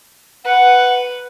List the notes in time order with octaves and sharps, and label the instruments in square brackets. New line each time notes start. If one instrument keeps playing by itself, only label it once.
[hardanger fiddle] B4 [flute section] F#5